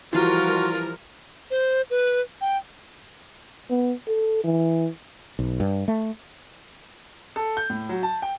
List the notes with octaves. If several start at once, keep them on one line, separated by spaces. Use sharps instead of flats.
E3 F3 G3 F4 F#4 A#4 C6
C5
B4
G5
B3
A4
E3
B1
G2
A3
A4
G6
A2
F#3
A5
G5